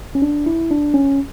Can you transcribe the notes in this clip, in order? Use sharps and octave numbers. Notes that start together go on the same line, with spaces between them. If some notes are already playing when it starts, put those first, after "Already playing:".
C#4
D4
E4
D4
C#4